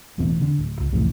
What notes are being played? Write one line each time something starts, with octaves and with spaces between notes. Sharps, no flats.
E1 A1 E2 C4
D3
D1
C#2
C2 F2 A2 E3